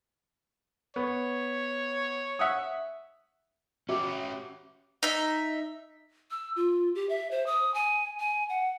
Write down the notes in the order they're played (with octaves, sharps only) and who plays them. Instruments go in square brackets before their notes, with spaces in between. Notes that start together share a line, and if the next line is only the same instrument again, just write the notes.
[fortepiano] B3 [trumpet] C#5
[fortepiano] E5 F#5 D#6
[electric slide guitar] C#4 G4 [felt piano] F#4 E5 [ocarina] D6
[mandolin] D#4 E5
[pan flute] E6
F4
G4
E5
C5
D#6
G#5
G#5
F#5